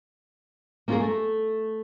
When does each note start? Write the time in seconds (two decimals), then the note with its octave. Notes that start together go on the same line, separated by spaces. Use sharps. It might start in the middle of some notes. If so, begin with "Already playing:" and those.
0.88 A#3 C#4 F4 F#4 G#4 A#4
1.00 A3